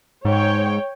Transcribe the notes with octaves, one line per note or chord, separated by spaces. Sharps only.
G#2 C#5 G5